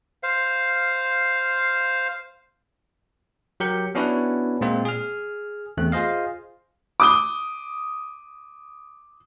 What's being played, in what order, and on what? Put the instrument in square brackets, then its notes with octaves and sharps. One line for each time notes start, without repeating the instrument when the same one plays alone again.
[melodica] C5 F5
[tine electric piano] F#3 G4 A#4 G6 C#7
B3 C#4 D4 E4 F#4 B4
A#2 G#3 C4 F4
G#4 F6
E2 A3 C4 F#6
F4 G#4 C5 D#5 F5
[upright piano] D6 D#6 G7